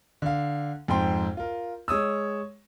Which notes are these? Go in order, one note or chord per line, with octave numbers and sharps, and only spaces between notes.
D3 F5
F2 G#2 C4 G5 C6
F4 A#4
G#3 C#5 D#6 E6